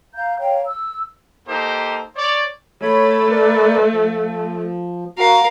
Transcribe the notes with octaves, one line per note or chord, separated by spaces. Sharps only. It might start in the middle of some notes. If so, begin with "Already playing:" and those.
F5 A#5 G6
C#5 F5 G5 A#5
E6
A#3 D#4 G4 A4 C5
C#5 D5
A3 C#5 B5
A#4 B4 D5
F3
F#4 A#4 F5